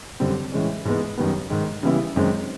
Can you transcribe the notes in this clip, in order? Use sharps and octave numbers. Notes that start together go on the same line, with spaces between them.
F#2 D3 G3 C4
A2 E3 G#3 C#4
G#2 E3 G#3 B3
F#2 D#3 G3 B3
G#2 D#3 G#3
C#3 E3 G3 B3 E4
F#2 D#3 G#3 C4